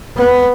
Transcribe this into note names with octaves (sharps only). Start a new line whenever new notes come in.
B3